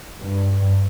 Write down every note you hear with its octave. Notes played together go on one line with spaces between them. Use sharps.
G2